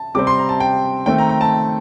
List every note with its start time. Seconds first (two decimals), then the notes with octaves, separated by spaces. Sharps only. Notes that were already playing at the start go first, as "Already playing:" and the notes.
Already playing: A5
0.15 C3 G3 C4 D6
0.27 C6
0.38 A#5
0.49 A5
0.60 G5
1.06 D#3 A3 C4 G5
1.18 A#5
1.29 A#5
1.41 A5